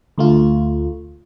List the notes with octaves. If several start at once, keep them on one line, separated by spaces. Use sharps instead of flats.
D2 A3 F4